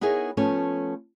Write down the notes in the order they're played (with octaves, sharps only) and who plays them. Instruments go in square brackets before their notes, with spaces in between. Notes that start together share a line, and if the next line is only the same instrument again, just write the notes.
[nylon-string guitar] B3 D#4 E4 G#4 A#4 C#5
F3 A3 B3 C#4 A4 C#5